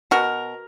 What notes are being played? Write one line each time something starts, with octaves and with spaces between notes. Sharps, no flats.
B2 F#4 A#4